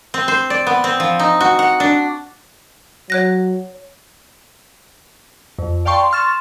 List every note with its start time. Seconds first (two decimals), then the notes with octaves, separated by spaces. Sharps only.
0.14 C4
0.28 C5
0.50 D5
0.67 B3
0.84 C4
1.00 F3
1.19 D#4
1.40 F#4
1.59 F#5
1.80 D4
3.10 F#3 C#5 F#6 A#6
5.59 F2
5.85 D5 F5 G5 A5 C6 C#6
6.11 C6 C#6 F6 A6 E7